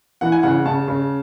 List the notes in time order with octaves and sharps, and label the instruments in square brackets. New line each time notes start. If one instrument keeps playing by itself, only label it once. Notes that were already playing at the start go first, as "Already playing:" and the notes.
[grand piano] E3 F#5
G#5
C#3 F#5
C#3 A5
C#3